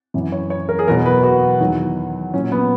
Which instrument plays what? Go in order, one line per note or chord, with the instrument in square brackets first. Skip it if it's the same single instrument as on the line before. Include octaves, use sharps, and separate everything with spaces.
[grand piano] F#2 E3
C#5
C#5
A#4
G#4
E2 B2 F#3 A#4
B4
F#4
E2 D#3 F#3
A#2 F#3 C#4
B3